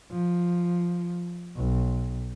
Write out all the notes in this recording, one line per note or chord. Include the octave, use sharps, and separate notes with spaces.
F3
B1